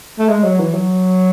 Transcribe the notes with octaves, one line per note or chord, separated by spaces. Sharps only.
A3
G#3
F#3
E3
F#3